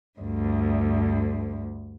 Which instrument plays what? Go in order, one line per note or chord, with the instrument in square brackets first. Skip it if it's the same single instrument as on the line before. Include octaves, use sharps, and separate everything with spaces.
[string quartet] D2 G2